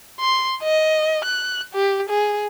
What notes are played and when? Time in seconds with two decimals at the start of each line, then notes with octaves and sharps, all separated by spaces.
0.20 C6
0.63 D#5
1.25 F#6
1.73 G4
2.09 G#4